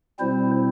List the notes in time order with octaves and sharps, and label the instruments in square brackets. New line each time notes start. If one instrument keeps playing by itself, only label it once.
[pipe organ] B2 G3 C4 E4 C5